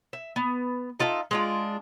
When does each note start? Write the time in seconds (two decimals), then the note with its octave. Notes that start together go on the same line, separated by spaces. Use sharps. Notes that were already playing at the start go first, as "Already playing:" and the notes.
0.13 E5
0.36 B3
1.00 D#4 F4 A4 E5
1.31 G#3 D4 F4